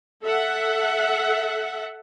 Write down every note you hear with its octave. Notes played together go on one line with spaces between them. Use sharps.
A4 E5 F#5